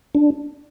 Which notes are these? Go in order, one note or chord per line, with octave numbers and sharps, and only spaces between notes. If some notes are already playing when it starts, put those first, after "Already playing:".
D4